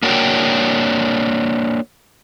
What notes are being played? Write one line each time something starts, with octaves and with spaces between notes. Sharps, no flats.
A#3 D4 F#4 A#4 C#5 G5